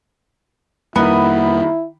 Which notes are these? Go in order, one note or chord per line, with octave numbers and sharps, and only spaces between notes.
F2 D#3 G3 A#3 B3 E4 A#5 B5